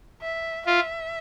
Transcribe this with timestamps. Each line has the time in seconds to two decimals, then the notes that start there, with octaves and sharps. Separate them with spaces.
0.21 E5
0.66 F4 E5